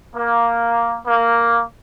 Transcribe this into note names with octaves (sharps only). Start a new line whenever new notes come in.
A#3
A#3